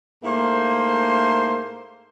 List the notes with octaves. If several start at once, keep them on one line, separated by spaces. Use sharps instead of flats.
G#2 A3 A#3 E4 C5 C6